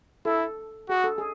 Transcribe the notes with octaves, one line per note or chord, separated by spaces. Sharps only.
E4 A4
F#4 G#4
A4
G#4